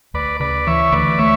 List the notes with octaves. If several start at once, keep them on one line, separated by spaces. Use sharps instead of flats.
D2 B4 D5
C#3 B4 D5
E3 C#5 E5
D2 B4 D5
A3 C#5 E5